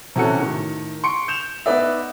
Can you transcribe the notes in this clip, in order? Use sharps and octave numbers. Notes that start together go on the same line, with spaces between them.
C3 E3 C#4 F#4 A4 C#7
A2 D#3
C6 C#6 C#7 D7
G6 E7 F7
B3 D#4 B4 D5 E5